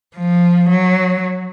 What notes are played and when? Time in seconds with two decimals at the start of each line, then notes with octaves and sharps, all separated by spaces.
0.15 F3
0.70 F#3